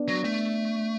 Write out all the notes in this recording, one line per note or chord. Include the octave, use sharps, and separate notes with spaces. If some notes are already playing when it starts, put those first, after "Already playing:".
Already playing: B3 D4
F#3
A3